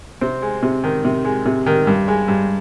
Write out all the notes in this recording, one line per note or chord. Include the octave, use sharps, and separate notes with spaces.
C3 C4
G#3
C3
D#3
C3
G#3
C3
D#3
G2
G#3
G2